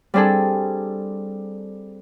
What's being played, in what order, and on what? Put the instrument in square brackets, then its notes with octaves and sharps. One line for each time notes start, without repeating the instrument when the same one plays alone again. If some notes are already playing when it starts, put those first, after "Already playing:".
[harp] G3 C4 D4 G#4 A4